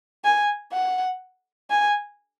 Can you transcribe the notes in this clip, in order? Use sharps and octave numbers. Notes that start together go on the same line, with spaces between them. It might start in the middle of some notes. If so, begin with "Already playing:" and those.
G#5
F#5
G#5